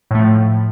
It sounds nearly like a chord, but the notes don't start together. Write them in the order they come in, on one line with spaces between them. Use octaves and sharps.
A2 A3 F3